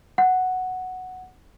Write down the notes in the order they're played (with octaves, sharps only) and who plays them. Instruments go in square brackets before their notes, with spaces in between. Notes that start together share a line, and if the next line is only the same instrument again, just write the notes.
[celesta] F#5